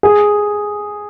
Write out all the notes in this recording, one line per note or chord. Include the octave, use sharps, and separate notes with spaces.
G#4